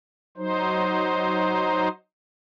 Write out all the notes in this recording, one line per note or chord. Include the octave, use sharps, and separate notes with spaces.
F#3 D#4 C5